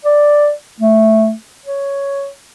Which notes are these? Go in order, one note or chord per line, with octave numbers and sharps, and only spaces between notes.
D5
A3
C#5